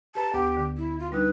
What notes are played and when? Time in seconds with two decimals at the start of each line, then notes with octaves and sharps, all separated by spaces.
0.15 G4 B4 A5 A#5
0.33 D2 B3 G4
0.57 D3
0.77 E4
1.00 F4
1.12 G3 D4 D#4 B4